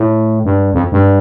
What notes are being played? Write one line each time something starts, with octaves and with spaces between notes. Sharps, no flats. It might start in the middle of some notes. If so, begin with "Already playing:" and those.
Already playing: A2
G2
F2
G2